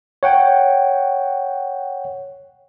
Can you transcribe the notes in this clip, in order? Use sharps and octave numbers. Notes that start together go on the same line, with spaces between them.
C#5 F#5 G5